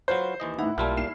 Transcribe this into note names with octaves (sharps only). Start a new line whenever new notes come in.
F#3 F4 B4 C5
D#2 E3 D#5
A2 D#4 E4 F#5
B1 A#2 G3 A#3 E4 A5 C6 F6
D#2 C7 E7